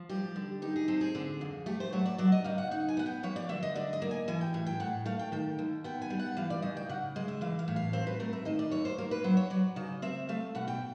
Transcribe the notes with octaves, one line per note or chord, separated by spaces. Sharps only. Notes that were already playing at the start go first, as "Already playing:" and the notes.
Already playing: F3
G3 G4
D3
D#4 G4
G#4
C4 A4
G#4
D3
F2
A3 G4
C5
F#3 C#5
D5
F#3 D5
D#5
C#3 F5
F#5
D#4 F#5
G#5
B3 F#5
G5
F3 C#5
D5
D3 E5
D#5
D3 D5
D#5
A#3
G#5
E3 G#5
G5
A2 G#5
G5
A2 F#5
A3 F5
G5
D#3 G5
D#2
B3 G5
G#5
G3
F#5
E3 F5
D5
C#3 D#5
G5
C#3 F#5
G#3 D#5
E5
E3 F5
F5
A2
F5
C4 C5
B4
A3 A#4
E5
D#3 D#5
D5
D#2 C#5
C5
A#3 A#4
B4
F#3 C5
C#5
F#3 D5
C#3 D#5
C4 E5
A3 F5
B2 F#5
G5